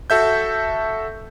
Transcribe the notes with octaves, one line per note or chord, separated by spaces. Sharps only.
F#4 A4 E5 G6